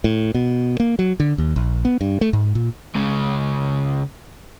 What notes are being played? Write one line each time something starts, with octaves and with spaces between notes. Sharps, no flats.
A2
B2
A#3
F#3
D3
D#2
A#1
B3
G2
A3
G#2
A#2
C#2 C#3